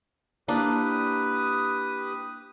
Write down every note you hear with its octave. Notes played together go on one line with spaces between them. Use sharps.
A#3 D4 E4 G4 B4 D#6